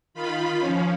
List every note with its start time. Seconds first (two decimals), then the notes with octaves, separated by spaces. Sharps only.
0.14 D#3 F4 B5
0.59 F3 C#4